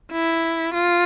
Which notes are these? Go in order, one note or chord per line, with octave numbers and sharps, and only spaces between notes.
E4
F4